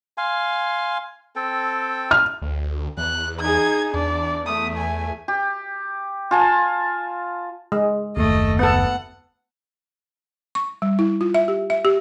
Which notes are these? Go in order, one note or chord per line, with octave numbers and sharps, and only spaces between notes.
F5 G#5 C6
C4 A4 G5
F6
D2
E2 F#6
D#4 G#4 G#6
E2 D4 D5
A3 D#6
G#5
G4
F4 G#5 A5
G#3
F#1 D#2 A3 D#5
B3 A4 F#5
C#6
G3
E4
F4
E5
G4
E5
G4